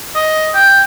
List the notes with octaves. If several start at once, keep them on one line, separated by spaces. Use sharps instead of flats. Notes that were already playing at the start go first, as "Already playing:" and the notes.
D#5
G5